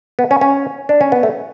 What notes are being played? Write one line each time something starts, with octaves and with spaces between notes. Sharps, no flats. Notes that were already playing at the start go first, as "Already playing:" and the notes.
B3
C#4
C#4
D4
C#4
B3
A3